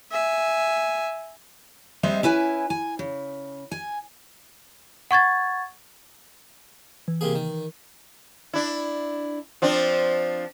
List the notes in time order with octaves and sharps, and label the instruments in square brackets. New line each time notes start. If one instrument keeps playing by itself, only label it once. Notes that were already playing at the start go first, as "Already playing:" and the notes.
[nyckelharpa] E5 G#5
[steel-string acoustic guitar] G3 G#3 C4 C5 D#5 E5
C#4 E4 B4 G#5
G#5
C#3
G#5
[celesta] F#5 C#6 G#6 A6
[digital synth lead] E3
[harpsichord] C3 A#3 G#4
D#3
[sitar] D4 E4
F3 C4 D4